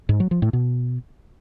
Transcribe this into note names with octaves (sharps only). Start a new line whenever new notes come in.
G#2
F#3
F3
A2
B2